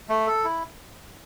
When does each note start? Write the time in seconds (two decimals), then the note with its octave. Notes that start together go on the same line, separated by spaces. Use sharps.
0.09 A3
0.27 A4
0.44 E4